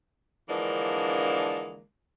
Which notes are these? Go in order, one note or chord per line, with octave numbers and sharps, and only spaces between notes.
D3 E3 F3 G#3 A#3 D4